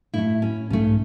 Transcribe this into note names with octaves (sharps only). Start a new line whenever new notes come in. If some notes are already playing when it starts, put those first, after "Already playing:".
A2 A3 E4
C#4
B1 G#2 A3 C#4